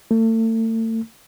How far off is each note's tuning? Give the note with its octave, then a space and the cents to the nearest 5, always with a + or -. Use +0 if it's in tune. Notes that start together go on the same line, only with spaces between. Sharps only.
A3 +40